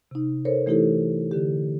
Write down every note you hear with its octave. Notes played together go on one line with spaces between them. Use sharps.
C3 D#4
A4 A#4 C5 C#5
E3 A3 D#4 E4 G4 A4
D3 G4